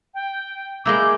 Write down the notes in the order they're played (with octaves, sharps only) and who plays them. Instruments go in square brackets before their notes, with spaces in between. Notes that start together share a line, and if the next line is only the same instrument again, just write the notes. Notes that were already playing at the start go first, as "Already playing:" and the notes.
[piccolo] G5
[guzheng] G#3 A#3 E4 [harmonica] D6 [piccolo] G6